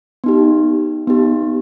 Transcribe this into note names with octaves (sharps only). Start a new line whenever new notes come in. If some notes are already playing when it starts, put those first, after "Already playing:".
B3 D#4 G4
B3 D#4 G4